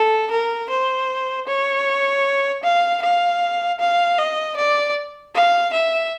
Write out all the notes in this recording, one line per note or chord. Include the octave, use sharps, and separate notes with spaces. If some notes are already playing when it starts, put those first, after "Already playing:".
Already playing: A4
A#4
C5
C#5
F5
F5
F5
D#5
D5
F5
E5